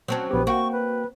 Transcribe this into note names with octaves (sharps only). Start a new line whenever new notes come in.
F#3 C4 C#4 C5 A5
A#1 B3 G4
A#3 F#4 G5 C#6
B4